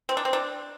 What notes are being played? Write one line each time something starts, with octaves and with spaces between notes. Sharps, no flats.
C4
D4
C4
D4